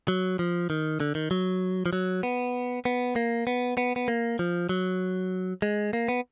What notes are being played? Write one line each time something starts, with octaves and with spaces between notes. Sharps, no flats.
F#3
F3
D#3
D3
D#3
F#3
F3
F#3
B3
B3
A#3
B3
B3
B3
A#3
F3
F#3
G#3
A#3
B3